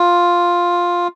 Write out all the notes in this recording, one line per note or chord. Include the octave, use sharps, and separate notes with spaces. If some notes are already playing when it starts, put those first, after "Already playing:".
Already playing: F4